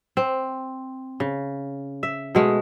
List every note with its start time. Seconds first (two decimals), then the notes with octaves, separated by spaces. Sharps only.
0.17 C4
1.20 C#3
2.03 E5
2.35 B2 G#3 A3